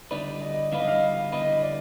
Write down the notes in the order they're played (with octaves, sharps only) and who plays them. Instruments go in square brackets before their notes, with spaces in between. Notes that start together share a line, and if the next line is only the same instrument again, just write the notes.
[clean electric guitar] D3 G3 B3 D#4 B4 [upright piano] D5
[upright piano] D#5
[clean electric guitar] D3 G3 B3 D#4 B4 [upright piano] F5
[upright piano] D#5
F5
[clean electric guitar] D3 G3 B3 D#4 B4 [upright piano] D#5
[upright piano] D5